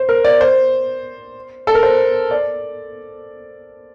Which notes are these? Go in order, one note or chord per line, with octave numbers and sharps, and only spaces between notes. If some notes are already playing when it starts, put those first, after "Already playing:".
Already playing: C5
A#4
D5
C5
A4
A#4
C5
D5